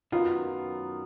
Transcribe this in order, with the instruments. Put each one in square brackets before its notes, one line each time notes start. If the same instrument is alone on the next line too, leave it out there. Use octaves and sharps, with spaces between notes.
[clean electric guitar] F#2 D#3 F#3 B3 [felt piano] F4